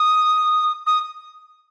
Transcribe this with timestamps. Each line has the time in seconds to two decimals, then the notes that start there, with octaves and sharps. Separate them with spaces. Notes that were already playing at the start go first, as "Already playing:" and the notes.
Already playing: D#6
0.87 D#6